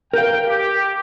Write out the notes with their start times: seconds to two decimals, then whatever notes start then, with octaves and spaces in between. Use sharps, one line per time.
0.13 A#4 F5 G5
0.48 G4